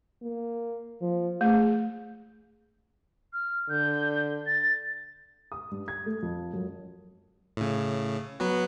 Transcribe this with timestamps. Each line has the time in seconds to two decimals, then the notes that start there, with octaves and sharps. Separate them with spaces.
0.23 A#3
1.02 F3
1.41 A3 G#4
3.33 F6
3.69 D3 G6
4.46 A6
5.52 D#6
5.71 G2
5.88 G#6
6.06 A3
6.23 F2
6.53 F#2
7.57 A2 C#3
8.40 F#3 B3 F#4